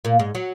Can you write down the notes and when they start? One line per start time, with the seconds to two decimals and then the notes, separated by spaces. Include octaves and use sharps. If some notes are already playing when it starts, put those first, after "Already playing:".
0.05 A#2 A#3
0.19 G#2 G#3
0.35 F#3